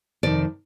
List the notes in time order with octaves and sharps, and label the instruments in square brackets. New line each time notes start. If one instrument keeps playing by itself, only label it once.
[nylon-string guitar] F2 C3 D#3 D5